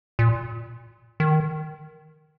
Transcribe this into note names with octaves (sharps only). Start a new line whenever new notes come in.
A#2
D#3